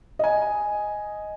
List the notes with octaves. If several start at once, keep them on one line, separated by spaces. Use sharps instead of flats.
D#5 G#5